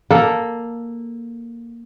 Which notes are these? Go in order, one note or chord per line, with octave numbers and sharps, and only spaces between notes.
A#3 A4